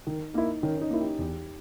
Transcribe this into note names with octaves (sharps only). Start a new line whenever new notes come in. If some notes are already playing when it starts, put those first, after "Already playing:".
D#3 D#4
A#3 D#4 E4
D#3 C#4
C#4
D#4
A#3 E4
G4
E2 G4